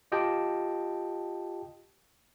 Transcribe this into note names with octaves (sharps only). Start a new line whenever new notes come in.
F4 G4 D#5 G5 A5